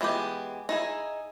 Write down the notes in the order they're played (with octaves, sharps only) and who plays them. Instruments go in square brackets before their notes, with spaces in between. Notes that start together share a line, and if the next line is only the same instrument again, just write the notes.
[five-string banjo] E3 G#3 B3 G4
D#4 E4 G#4